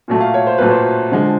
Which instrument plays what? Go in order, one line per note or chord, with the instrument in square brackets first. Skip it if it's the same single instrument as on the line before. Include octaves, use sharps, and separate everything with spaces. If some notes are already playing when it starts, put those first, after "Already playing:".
[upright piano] A#2 F#3 A3
F5
C#5
C5
A#2 F#3 A3 B4
C5
D3 F3 G#3